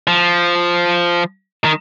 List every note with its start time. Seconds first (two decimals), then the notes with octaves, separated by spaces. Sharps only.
0.07 F3
1.65 D#3